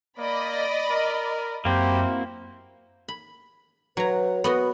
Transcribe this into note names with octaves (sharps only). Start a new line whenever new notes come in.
A#3 D5 D#5 B5
A#4
F#2 A#3 C4 E4 F#4 G4
B5
F#3 B4 A#5
B3 F#4 B4 D#5